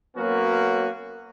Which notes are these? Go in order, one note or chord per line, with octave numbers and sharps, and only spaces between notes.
F#3 A#3 B3 C#4 F#4